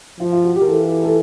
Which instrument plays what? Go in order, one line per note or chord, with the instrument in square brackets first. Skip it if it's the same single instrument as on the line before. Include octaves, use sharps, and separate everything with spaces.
[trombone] F3 [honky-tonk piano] F4
[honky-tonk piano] F4
F#4
G4
A#4
[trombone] E3 [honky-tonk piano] A4
[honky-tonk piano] A4